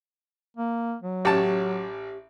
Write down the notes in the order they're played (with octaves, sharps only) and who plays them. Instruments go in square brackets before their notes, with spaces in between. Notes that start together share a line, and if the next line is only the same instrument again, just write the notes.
[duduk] A#3
F#3
[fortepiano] A1 A5 [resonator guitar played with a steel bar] C#4 G4 F#5